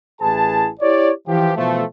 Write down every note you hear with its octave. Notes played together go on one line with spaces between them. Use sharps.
A1 E4 G#4 B4 A5
E4 G4 C#5 D5
E3 F3 G4
B2 E3 F3 A3